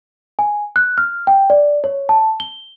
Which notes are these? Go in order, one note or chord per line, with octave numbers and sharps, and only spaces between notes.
G#5
F#6
F6
G5
D5
C#5
A5
G7